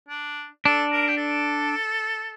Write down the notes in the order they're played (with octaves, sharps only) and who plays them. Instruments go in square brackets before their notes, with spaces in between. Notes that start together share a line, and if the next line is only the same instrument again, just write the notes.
[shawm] D4
[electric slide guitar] D4 [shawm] A4
[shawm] A#4
G4
A4